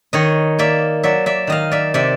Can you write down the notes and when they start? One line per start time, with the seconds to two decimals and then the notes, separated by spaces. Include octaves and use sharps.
0.13 D#3 C#5 D#5
0.59 A#3 D5 E5
1.03 F#3 D5 E5
1.26 D5 E5
1.47 D#3 D#5 F5
1.71 D5 E5
1.94 C3 D5 E5